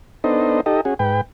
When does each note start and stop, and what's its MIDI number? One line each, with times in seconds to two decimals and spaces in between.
0.24 0.61 59
0.24 0.61 62
0.24 0.61 63
0.24 0.61 69
0.24 0.61 72
0.24 0.61 75
0.66 0.81 63
0.66 0.81 67
0.66 0.81 69
0.66 0.81 75
0.85 0.94 61
0.85 0.94 66
0.85 0.94 68
0.99 1.21 44
0.99 1.21 71
0.99 1.21 79